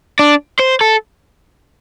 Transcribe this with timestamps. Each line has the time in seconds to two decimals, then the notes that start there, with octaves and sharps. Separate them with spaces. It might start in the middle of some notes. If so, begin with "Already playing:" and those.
0.19 D4
0.59 C5
0.81 A4